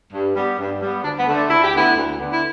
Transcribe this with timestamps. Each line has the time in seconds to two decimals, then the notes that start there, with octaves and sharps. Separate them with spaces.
0.13 G2
0.36 G3 B3
0.58 G2
0.82 G3 B3
1.04 D2 D4
1.19 B3
1.27 D3 A3
1.35 D4
1.49 D2 E4
1.64 G4
1.73 D3 A3 B3 E4
1.96 D2
2.18 D3 B3
2.32 E4